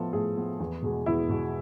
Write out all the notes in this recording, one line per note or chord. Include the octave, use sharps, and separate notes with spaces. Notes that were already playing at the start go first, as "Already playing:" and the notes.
Already playing: A2 F3 B3 A4
A2 G#4
F3 B3
E2
B2 G#3 B3
E2 E4
B2 G#3 B3